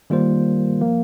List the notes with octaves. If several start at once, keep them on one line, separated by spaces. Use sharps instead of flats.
D#3 G3 A#3 F4 C5
F3 A#3